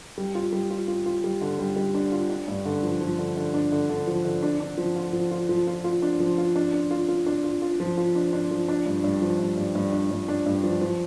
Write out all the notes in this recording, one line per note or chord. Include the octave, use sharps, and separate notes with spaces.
G3
F4
G3
F4
F4
F4
G3
D3
G3
G3
D4
F4
D4
G2
D3
F3
F3
D3
D3
D4
D3
D3
F3
D3
D4
D4
F3
F4
F3
F4
F3
F4
F4
D4
F3
F4
D4
D4
F4
F4
D4
F4
F4
F3
F4
D4
D4
F3
D4
G2
G2
F3
G2
G2
G2
D4
G2
D4
G2
F3
F3